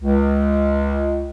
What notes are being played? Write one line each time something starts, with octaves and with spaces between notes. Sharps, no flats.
C#2